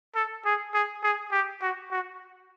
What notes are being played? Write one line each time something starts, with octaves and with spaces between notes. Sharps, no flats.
A4
G#4
G#4
G#4
G4
F#4
F#4